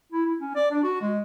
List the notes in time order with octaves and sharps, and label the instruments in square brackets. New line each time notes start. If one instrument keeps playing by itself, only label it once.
[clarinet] E4
E4
C#4
D5
D4
F#4
G#3